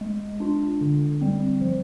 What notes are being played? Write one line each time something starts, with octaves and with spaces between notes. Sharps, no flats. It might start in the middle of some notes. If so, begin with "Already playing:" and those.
G#3
D4 F4
D3
G3 C4
F3